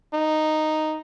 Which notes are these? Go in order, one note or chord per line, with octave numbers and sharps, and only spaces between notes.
D#4